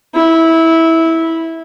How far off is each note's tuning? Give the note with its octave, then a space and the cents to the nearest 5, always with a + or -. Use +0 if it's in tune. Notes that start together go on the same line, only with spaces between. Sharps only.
E4 -15